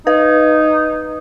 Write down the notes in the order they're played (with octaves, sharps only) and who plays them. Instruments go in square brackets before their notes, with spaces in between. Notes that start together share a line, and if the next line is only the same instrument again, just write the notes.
[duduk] D#4 [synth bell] B4